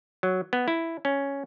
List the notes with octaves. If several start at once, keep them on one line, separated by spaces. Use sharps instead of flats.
F#3
B3
E4
C#4